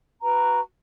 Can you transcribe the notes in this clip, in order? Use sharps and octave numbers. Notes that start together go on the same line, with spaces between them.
F#4 B4 A#5